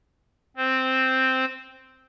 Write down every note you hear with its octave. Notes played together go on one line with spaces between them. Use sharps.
C4 C5